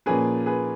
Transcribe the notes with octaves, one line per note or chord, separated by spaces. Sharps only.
A#2 F3 A#3 C#4 G#4 B4
G#4 B4